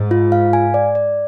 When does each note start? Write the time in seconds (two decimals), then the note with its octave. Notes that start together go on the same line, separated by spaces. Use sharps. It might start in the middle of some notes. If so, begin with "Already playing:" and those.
Already playing: G#2
0.11 F4
0.32 F5
0.53 G#5
0.74 D5
0.95 D5